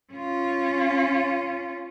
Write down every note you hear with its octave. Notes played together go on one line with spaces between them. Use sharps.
C#4 F4